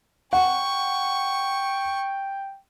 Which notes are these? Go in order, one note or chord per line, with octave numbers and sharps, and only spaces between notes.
F#5 G5 C#6